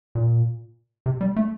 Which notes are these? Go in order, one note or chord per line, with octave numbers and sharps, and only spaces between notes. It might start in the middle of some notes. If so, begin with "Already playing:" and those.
A#2
C3
G3
A3